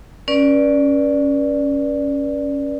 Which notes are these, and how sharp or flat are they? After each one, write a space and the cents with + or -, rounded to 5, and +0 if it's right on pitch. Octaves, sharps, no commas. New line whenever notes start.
C#4 +0 B4 -40 D5 +0